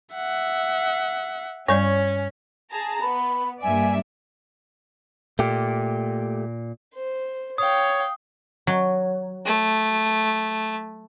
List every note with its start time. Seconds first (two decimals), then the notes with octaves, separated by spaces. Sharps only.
0.14 E5 F#5
1.68 G2 G3 C#4 C#5 D5
2.71 G#4 A5 A#5
3.02 B3 B5
3.63 G2 A#3 D5 E5 G#5
5.39 A#2 A3 G4
6.94 C5
7.58 C#5 F5 G5 D#6
8.67 F#3
9.46 A3